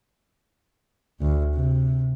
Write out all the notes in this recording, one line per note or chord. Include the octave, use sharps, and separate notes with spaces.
D2
C3